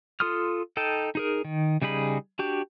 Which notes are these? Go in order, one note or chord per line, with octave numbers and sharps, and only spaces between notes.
F4 A4 C6 D#6 F6
D#4 A4 G5 A5
D#4 G#4 A#4
D#3
C#3 G3 D#4 G#4 B5
D4 F#4 G4